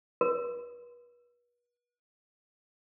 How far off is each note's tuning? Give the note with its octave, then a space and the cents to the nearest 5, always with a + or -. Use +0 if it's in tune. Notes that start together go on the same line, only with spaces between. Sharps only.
B4 -35